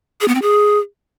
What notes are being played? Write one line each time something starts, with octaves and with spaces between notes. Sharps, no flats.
G#4
B3
C4
G#4